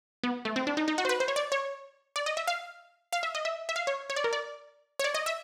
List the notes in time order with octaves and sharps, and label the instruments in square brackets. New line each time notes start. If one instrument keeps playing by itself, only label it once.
[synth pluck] B3
A3
C4
D4
D#4
D#4
F#4
C5
B4
C5
C#5
D5
C#5
D5
D#5
E5
F5
F5
E5
D#5
E5
E5
F5
C#5
C#5
D5
A#4
D5
C#5
D5
D#5
E5